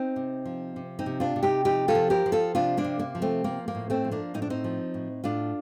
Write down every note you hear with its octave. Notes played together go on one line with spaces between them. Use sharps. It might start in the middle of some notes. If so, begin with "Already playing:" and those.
Already playing: C4 D#4
C3
F3
C3
C4 D#4
C3
D4 F4
C3
D#4 G4
F3 D#4 G4
F4 A4
F3
G4 A#4
F3
F4 A4
C3 D4 F4
A#3 D4
C3
A#3
F3
A3 C4
F3 A#3
A#3
A2
A3 C4
F3
A#3 D4
A2 D#4
D4
C4 D#4
F3
A2
A2 D4 F4